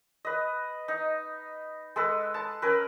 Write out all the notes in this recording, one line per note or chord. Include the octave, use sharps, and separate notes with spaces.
B4 D#5
D#4
G#3 A4 B4
A5
C#4 A#4 B4